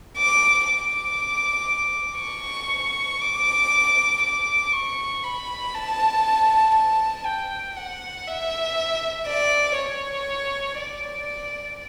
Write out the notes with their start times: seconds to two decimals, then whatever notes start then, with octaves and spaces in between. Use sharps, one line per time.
0.18 D6
0.68 D6
2.20 C#6
3.21 D6
4.22 D6
4.72 C#6
5.23 B5
5.74 A5
6.75 A5
7.25 G5
7.77 F#5
8.27 E5
9.27 D5
9.78 C#5
10.80 D5